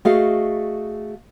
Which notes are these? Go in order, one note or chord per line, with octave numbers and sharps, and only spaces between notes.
A3 F#4 G#4 D#5 F5